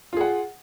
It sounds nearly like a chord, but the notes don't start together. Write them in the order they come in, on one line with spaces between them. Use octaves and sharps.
F4 G#4 F#5